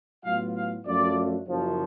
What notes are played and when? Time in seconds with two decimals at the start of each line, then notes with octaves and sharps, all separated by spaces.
0.25 A2 F#3 B3 F4 F5
0.56 F5
0.86 F#2 F3 A3 D4 F4 D5
1.48 F#1 F#2 F3